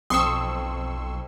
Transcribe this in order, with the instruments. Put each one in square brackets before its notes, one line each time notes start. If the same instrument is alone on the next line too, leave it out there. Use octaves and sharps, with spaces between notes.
[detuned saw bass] B1 [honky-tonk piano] F2 C4 [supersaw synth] C6 C#6 E6 [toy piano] D#6